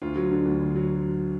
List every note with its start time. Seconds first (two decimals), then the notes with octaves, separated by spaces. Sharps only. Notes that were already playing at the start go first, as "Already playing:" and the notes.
0.02 D2 F4
0.16 F#3
0.31 D3
0.45 D2
0.60 D2
0.76 F#3